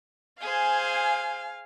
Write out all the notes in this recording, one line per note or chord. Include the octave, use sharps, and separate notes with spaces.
G#4 C5 F5 G#5